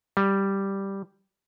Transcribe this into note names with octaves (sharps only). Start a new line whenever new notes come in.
G3